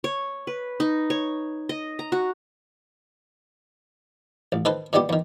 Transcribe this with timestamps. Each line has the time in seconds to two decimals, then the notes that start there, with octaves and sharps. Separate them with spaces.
0.04 C#5
0.47 B4
0.80 D#4
1.10 C#5
1.69 D#5
1.99 A#5
2.12 F#4
4.52 A1
4.65 D#3 A4 B4 C5
4.93 A#2 D#3 G3 B3 G4
5.09 E2 D#3